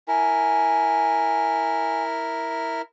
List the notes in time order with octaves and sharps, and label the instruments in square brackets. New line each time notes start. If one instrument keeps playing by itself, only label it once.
[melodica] E4 A#4 [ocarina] G#5